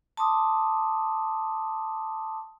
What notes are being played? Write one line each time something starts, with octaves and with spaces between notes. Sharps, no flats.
A5 C6 D6 D#6